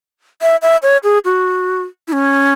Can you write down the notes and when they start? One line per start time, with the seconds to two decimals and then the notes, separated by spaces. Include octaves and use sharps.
0.42 E5
0.62 E5
0.83 C#5
1.04 G#4
1.25 F#4
2.08 E4
2.13 C#4